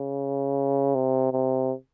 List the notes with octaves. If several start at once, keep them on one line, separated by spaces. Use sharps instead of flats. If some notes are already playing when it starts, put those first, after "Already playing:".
Already playing: C#3
C3
C3